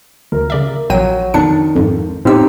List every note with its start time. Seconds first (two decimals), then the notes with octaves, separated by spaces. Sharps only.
0.32 D2 A#4
0.50 C#3 D5 E5
0.90 A#1 F#3 G5 D#7
1.34 F2 D#3 D4 C#7
1.76 F2 G#2
2.25 A2 C4 D#4 G4 E6